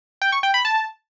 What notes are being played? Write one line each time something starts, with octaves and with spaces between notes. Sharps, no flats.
G5
C#6
G5
B5
A5